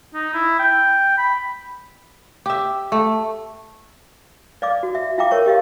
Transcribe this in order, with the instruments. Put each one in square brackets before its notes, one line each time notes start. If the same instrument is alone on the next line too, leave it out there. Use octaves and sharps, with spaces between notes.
[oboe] D#4
E4
G5
B5
[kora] G4 E5
A3
[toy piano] D5 D#5 F5 D6
F#4
E5
F4 E5 F5 G5 A#5 D6
A#4 C#5 C#6
G4 D#5 F5